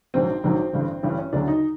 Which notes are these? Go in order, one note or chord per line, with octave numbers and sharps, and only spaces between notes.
A#1 G#2 D#3 F#3 C4
A#1 G#2 D#3 F#3
A1 G2 D3
A1 G2 D3 C#4
C#4
D2 C#3 F#3 D4
D#4